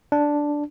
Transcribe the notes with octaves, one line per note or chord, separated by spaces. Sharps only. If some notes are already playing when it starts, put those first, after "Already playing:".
D4